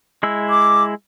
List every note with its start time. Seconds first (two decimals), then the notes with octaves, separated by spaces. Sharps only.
0.23 G#3 E4 E6
0.50 D6